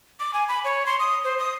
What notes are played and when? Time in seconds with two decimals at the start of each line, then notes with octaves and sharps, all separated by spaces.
0.20 D6
0.34 G#5
0.48 B5
0.64 C#5
0.86 C6
1.00 D#6
1.24 C5
1.39 D#6